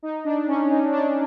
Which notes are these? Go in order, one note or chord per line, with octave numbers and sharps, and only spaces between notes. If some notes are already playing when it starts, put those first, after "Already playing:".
D#4
D4
C#4
D#4
D4